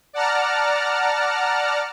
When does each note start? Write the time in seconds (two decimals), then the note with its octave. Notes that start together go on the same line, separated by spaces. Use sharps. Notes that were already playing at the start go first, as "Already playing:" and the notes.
0.13 D5 F#5 A5 A#5 F6